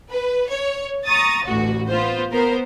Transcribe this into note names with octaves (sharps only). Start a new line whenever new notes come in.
B4
C#5
A#5 C#6 D#6 A6
A1 D2 F#4
B3 F4 C5
B3 A#4 C5